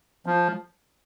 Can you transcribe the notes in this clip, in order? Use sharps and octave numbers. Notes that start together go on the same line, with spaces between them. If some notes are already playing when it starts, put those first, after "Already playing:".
F3